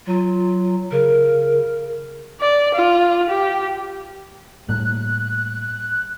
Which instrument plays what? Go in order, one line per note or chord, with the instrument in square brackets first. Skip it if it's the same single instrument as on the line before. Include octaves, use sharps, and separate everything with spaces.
[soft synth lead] F#3 [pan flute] F4
[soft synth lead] C#3 [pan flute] A#4
[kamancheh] D5
F4
G4
[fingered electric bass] A2 G3 A#3 [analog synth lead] F#6